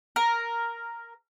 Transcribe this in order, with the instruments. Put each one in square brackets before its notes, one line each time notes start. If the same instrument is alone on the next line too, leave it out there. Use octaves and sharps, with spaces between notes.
[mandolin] A#4